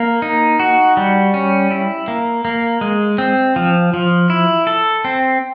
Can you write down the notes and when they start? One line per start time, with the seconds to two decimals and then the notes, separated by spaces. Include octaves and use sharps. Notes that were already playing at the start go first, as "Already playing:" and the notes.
Already playing: A#3
0.22 D#4
0.59 F#4
0.97 G3
1.34 C#4
1.71 E4
2.08 A#3
2.45 A#3
2.81 G#3
3.18 C4
3.56 F3
3.94 F3
4.30 E4
4.67 A4
5.05 C4